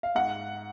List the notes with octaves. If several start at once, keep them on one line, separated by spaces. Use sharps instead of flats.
F5
G#2 F#5